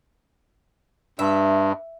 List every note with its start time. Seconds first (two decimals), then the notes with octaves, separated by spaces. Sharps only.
1.19 G2 E5